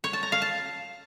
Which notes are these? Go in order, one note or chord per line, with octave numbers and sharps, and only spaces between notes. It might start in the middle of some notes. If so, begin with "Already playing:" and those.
C#5
A5
A#5
F5
A5